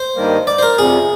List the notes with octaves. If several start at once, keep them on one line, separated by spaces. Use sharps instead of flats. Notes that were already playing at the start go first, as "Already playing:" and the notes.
Already playing: C5
G2 D#3 G3 A#3
D5
C5
A#4
F2 C3 G3 G#4